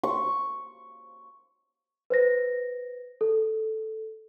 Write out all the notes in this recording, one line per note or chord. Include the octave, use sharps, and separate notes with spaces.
C#6
B4 C5 A#6
A4